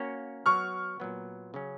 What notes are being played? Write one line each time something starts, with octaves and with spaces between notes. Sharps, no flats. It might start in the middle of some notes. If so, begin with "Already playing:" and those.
Already playing: A#3 C#4 F#4 C#5
F#3 B3 F#4 C#6 F6
A#2 F#3 B3
C#3 F#3 C#4